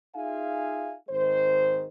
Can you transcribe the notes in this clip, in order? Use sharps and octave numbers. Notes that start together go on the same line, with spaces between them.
D#4 F4 G#4 E5 F5 G#5
G#1 D#3 G#3 C5